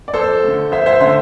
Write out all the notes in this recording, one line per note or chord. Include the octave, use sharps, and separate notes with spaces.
D5
F2 A4 C5
D3 A3
F2 C5 E5
C5 E5
D3 A3 C5 E5